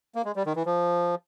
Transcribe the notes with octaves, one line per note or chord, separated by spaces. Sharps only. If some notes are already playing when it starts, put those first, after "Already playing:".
A#3
G#3
G3
D#3
E3
F3